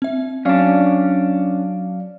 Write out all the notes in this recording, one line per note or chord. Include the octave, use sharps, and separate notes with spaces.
C4 E5
F#3 C#4 D4 D5 F5